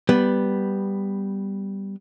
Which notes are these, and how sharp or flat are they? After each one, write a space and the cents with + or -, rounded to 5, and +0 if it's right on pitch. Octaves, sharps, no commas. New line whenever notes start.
G3 +0 B3 +0